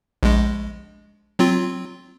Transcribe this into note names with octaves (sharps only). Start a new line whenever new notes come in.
A#1 G#3
F#3 C4 F4